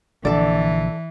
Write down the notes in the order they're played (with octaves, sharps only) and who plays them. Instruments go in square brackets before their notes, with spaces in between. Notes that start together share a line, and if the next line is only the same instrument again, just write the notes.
[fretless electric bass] A#1 D3 [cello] E3 [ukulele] A4 D5